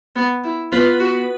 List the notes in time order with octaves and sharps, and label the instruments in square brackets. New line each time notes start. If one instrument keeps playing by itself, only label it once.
[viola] B3
E4
[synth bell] B3 B4 [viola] F4
[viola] F#4